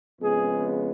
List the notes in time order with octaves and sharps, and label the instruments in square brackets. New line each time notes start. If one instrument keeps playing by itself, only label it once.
[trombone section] F2 C#3 G#3 B3 G#4